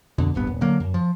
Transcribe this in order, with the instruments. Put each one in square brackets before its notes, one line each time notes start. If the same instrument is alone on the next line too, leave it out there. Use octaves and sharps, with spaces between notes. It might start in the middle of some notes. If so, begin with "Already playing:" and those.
[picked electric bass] F2 B2 D3
D#1 G#1 G2 B3
D#1
D3 F#3 A#3
F#2
F3